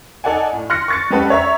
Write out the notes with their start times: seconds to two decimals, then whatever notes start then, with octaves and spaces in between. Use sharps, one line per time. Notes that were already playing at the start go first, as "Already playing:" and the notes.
0.24 D#4 A4 D5 F#5 G#5
0.53 A2
0.70 C6 F6 F#6 A#6 C#7
0.88 C#6 A6 C#7
1.10 G#3 C#4 G4 A4 B4 F#5
1.30 C#5 E5 A#5